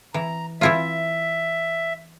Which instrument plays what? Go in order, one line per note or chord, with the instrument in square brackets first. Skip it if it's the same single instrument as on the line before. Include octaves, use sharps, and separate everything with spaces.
[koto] E3 [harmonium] A#5
[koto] E3 E4 F4 [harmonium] E5